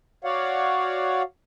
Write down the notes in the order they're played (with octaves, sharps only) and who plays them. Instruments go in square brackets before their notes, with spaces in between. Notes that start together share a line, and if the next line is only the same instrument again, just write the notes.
[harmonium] F#4 C#5 D5 F5 F#5